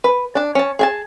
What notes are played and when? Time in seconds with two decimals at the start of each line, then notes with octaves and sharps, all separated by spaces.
0.04 B4
0.35 D4 A5
0.55 C#4 A5
0.79 G#4 G#5 A5